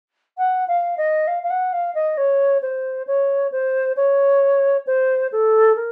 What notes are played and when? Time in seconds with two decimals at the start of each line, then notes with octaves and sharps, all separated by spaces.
0.38 F#5
0.68 F5
0.98 D#5
1.27 F5
1.43 F5
1.50 F#5
1.73 F5
1.95 D#5
2.17 C#5
2.62 C5
3.07 C#5
3.52 C5
3.97 C#5
4.87 C5
5.32 A4
5.76 A#4